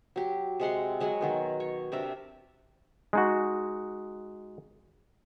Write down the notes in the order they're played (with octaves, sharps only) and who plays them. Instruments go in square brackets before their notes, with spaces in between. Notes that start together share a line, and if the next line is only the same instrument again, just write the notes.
[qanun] F#3 G4
C3 G#3 F#5 C6
F#3 G#3 F#5 G#5
B2 D#3 F#3
C#5
C3 D4 A#4 E5
[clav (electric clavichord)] G#3 D#4 F#4